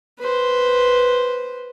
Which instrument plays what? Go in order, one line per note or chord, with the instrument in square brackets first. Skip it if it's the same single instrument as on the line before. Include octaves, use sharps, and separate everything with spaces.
[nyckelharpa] B4 C5